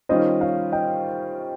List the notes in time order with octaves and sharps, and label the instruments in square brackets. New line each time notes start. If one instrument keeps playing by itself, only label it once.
[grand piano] D#3 G3 C#4 F4 [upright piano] C5 D#5
[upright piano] C#5 F5
D#5 G5